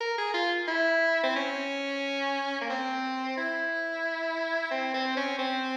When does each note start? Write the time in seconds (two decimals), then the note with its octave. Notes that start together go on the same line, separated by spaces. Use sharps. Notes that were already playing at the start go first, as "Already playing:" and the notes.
0.01 A#4
0.18 G#4
0.34 F4
0.68 E4
1.23 C4
1.36 C#4
2.61 A#3
2.70 C4
3.37 E4
4.71 C4
4.94 C4
5.17 C#4
5.38 C4